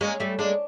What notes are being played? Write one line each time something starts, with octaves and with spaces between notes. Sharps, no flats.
G#3 A#3 C#4
G3 A3
G#3 A#3 D4